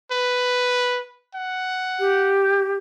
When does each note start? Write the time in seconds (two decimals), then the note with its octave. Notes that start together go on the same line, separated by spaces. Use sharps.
0.11 B4
1.35 F#5
1.99 G4